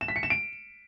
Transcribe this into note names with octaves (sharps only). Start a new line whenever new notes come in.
E7
B6
C#7
E7
D7